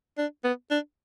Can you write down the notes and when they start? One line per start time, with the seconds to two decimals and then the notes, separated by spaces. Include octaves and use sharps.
0.18 D4
0.44 B3
0.71 D4